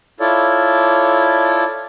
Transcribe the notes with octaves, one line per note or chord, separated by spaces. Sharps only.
E4 F4 A4 C#5 D5